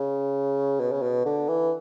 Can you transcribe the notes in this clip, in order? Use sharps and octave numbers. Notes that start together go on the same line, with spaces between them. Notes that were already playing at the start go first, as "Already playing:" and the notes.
Already playing: C#3
B2
C#3
B2
D3
E3